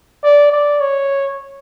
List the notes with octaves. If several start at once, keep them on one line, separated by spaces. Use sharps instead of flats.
D5
D5
C#5